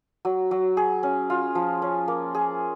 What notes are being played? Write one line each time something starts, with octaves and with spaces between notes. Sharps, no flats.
F#3
F#3
G#4
C#4
F4
F3
C#4
A#3
G#4